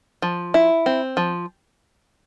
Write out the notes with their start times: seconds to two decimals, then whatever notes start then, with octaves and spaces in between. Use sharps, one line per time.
0.22 F3
0.54 E4
0.86 C4
1.17 F3